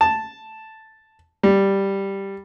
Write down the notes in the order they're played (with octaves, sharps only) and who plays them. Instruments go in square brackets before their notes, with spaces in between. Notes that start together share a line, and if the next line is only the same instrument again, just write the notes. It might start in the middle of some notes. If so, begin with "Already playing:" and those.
[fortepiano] A5
G3